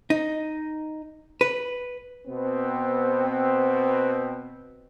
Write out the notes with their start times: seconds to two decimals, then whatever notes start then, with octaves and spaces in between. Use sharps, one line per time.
0.10 D#4
1.41 B4
2.28 B2 B3 C4